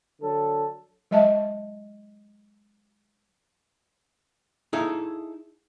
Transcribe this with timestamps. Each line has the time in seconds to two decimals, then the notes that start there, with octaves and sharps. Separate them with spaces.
0.21 D3 F#3 A4
1.11 F#3 G#3 D#5 E5 A5
4.73 D#4 E4 G#4 A4 E5 F5